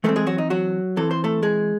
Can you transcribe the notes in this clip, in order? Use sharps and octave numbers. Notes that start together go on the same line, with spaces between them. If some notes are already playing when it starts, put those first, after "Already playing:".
E3 G#3 A3 C4 A4
G#3 G#4
F#3 F#4
D#4
F#3 F#4
E3 C4 A4
C5
A3 A4
G#3 G#4